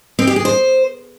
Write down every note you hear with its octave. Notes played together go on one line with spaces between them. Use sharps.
C4
G4
G#4
C5